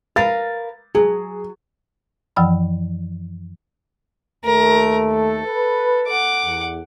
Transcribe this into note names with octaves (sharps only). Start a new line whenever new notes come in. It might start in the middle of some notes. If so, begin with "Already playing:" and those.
A#4 B4 F5 A6
F#3 G#4
F#2 E3 F3 G5 B5
D#2 A3 A#4
A4
B4
F#5 D6
E2